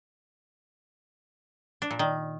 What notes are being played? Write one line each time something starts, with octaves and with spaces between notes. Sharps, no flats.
D4
A#2
D#3